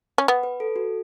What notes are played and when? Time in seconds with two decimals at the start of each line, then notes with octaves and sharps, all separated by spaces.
0.18 C#4
0.28 B3 B4
0.43 B4
0.60 A4
0.76 F#4